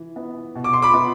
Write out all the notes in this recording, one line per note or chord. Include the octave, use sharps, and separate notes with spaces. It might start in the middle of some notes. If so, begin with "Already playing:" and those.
Already playing: E3
B3
B2
D6
C6
B5 D6
B3